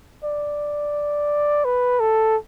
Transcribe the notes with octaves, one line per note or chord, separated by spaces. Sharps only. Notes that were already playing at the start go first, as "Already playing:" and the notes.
D5
B4
A4